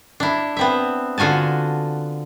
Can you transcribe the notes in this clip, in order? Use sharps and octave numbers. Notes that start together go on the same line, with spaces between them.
D4 E4
B3 C4 E5
D3 F4 F#4 G#5 A5